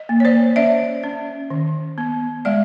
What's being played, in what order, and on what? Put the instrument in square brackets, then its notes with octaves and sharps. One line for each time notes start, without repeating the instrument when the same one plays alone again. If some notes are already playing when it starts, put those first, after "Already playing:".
Already playing: [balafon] D#5
A#3
C#5
C5 D5
C#4 D5 E5
C#4
D#3
B3
G#3 D5 E5